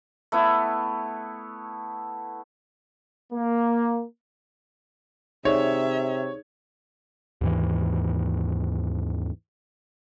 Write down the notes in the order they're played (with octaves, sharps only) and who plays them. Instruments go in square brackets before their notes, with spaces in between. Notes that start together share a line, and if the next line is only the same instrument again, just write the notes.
[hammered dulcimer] A3 B3 E4
[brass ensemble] A#3
[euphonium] C3 [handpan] D#4 G#4 D5 [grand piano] C#5 [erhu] E5
[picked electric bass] D#2 G#2 E3